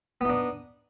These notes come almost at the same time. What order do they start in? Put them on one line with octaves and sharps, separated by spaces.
B3 D#4 D4